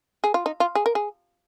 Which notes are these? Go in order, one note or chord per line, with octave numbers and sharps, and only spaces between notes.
G#4
F4
D#4
F4
G#4
A#4
G#4